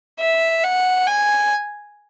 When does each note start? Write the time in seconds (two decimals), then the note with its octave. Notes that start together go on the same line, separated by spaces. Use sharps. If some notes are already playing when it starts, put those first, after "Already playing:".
0.20 E5
0.64 F#5
1.07 G#5